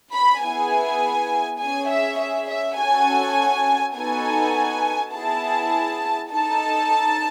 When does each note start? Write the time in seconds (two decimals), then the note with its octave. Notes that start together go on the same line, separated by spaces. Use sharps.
0.14 B5
0.43 B3 E4 G#4 G#5
1.60 C#4 G#4 G#5
1.90 E5
2.19 E5
2.49 E5
2.78 C#4 F#4 A4 G#5
3.96 B3 D#4 F#4 A4 G#5
5.14 B3 E4 G#4 A5
6.31 D#4 A4 A5